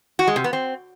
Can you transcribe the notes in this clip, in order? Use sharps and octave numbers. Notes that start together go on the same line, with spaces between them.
F#4
G#3
C3
B3
C4